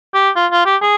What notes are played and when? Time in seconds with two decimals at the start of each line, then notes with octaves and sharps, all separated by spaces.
0.14 G4
0.36 F4
0.52 F4
0.65 G4
0.82 G#4